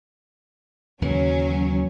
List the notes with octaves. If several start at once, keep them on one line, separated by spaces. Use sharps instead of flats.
D#2 C#3 E3 F#3 C#4